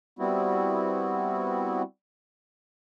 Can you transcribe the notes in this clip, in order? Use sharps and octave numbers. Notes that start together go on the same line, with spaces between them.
G3 B3 C4 E4 F#4